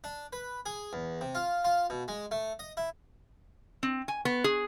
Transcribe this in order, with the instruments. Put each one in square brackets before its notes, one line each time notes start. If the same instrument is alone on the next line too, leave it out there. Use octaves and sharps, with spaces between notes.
[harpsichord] D4
B4
G#4
E2
C3
F4
F4
B2
G#3
A3
D#5
E4
[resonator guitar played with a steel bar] C4
G#5
B3
G#4